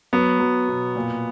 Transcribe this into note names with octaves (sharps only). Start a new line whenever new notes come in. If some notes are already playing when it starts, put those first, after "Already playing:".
F#3 B3
F#3
B2
A#2